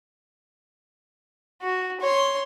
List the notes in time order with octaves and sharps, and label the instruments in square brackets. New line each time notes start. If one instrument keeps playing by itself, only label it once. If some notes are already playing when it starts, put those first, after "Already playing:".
[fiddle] F#4
C#5 C6